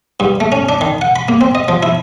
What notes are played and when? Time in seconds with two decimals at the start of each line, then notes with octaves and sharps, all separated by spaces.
0.20 G2
0.40 A3
0.52 C#4
0.69 D4
0.81 D#3
1.01 F#5
1.16 B5
1.28 A#3
1.41 C4
1.55 D#5
1.68 F3
1.83 E4